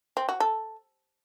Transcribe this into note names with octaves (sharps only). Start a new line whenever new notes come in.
C4
F#4
A4